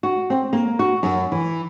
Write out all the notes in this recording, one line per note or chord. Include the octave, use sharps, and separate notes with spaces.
F#4
C4
A#3
F#4
F#2
E3